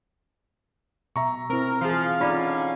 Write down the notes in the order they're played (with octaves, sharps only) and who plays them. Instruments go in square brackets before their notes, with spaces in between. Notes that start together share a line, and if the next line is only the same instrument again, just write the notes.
[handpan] B2 [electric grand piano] E5 A#5 C#6
[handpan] C4 E4 [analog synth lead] A#4
[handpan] E3 G#4 [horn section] F3 [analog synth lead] F5
[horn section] D3 C#4 [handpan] D#4 F4 D5 [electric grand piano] A#5 B5